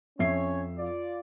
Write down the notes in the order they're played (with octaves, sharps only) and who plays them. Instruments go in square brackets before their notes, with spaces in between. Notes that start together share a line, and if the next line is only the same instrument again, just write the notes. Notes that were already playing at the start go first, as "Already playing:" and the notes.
[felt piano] F2 E5 C7 [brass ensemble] C#4 C#5
[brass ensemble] F4 D5